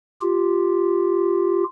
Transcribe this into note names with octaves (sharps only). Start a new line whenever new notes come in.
F4 G4